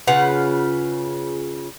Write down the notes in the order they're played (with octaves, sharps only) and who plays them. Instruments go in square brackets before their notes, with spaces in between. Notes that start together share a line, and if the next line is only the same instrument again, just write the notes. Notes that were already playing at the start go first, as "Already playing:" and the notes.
[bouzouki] C#3 F4 B4 F#5